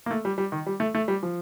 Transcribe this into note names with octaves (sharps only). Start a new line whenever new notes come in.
A#3
A3
G3
G3
D#3
G3
A3
A3
G3
F3